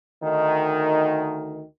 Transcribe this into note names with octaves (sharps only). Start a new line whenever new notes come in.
D2 D#3